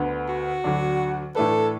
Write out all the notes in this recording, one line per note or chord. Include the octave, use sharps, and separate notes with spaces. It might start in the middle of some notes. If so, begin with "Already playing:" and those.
Already playing: D2 D3 B3
F#4
D2 D3 F#3 D4
A2 E3 A3 D4 A4 B4